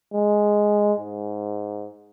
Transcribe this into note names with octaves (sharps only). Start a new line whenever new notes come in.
G#3
G#2